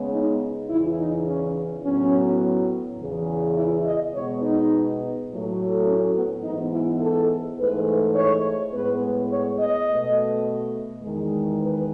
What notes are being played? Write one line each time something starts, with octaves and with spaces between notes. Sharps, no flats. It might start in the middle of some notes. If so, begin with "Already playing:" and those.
Already playing: C#3 G#3 B3
D#4
E2 C#3 E3 E4
D#4
C#4
A2 F#3 B3 C#4
E2 C#3 E3
E4
D#5
B2 G#3 B3 C#5
D#4
A2 F#3 A3
C#4
B3
G#2 E3 B3 D#4
E4
A4
G#2 E3 A3 B4
C#5
A2 G#3 B3 B4
C#5
D#5
B2 A3
E2 D#3 G#3
B4